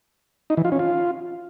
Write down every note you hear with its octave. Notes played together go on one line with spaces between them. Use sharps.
D#4
E3
F4
C#4
F4